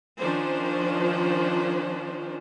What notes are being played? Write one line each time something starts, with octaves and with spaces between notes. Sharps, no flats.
D#3 F3 C#4 D4 C5